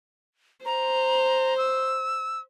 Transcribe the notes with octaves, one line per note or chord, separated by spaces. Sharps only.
C5 A#5
E6